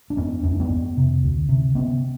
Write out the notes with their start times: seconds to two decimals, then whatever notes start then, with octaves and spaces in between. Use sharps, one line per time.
0.10 D4
0.17 F2 B3 C#4
0.43 F2 C#4
0.52 D4
0.59 B3 C#4
0.70 F2
0.97 C3
1.23 D2
1.49 C3
1.75 C3 B3 C#4